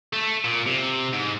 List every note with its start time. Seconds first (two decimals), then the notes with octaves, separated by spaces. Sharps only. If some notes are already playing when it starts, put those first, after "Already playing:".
0.13 A3
0.45 A#2
0.66 C3
1.13 G#2